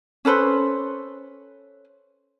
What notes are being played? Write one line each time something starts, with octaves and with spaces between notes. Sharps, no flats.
C#4 A4 B4 C5